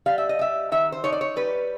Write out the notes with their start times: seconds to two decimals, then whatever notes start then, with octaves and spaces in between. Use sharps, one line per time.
0.06 G3 F5
0.18 E5
0.29 D#5
0.39 G3 E5
0.72 D#3 E5
0.92 C5
1.04 D#4 C#5
1.12 D5
1.21 C#5
1.36 G3 B4